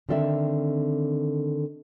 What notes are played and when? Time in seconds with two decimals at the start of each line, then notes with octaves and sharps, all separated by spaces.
0.09 D3 D#3 C4 A4 D5 E5